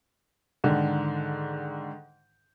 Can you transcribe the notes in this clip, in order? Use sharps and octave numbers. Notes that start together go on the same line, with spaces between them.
G#2 D3 D#3